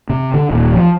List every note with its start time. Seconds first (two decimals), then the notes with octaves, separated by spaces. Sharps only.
0.10 C3
0.34 D3
0.51 D#1
0.74 F3